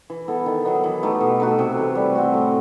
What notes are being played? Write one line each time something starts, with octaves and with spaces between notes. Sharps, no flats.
E3
B3 E4 A4
D#3
F#3 B3 D#4
E3
A3 D#4 G4
B2
A3 D#4 F#4
C3
E3 A3
G3
C4 F#4
A2